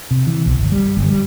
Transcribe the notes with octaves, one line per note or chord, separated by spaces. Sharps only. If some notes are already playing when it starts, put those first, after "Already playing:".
C3
E3
B1
G1
G3
G1
G3